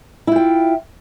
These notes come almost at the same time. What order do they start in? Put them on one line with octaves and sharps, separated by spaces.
E4 F4 G5